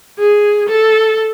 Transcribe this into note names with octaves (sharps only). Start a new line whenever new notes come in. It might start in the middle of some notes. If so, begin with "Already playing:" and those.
G#4
A4